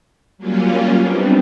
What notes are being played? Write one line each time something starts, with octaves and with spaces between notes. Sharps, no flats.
F#3 G3 A#3 C#4 F4
G3 B3 C4 D4 D#4